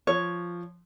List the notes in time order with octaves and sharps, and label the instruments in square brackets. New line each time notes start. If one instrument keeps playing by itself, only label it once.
[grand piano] F3 [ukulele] C#5